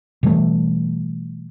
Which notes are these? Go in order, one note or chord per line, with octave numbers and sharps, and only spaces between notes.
B2 E3 G3 A3